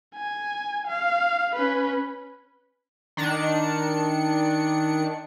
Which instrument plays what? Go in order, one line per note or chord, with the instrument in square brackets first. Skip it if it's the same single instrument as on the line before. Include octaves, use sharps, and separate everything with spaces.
[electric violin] G#5
F5
C#4 B4
[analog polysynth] D#3 D4 C#7